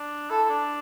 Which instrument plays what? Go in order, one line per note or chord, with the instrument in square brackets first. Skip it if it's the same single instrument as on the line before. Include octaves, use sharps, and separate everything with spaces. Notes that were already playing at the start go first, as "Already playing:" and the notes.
Already playing: [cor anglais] D4
[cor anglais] E4 [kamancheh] A4
[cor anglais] D4